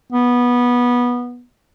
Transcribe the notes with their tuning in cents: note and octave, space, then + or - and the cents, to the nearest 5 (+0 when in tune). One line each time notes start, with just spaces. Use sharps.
B3 -15